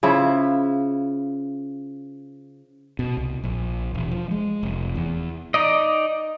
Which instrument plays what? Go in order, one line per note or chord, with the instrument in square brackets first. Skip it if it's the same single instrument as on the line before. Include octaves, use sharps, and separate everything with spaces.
[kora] C#3 F3 E4
[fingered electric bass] B2
C2
A#1
E1
F3
G#3
F1
E2
[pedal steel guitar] D#4 D5 D#5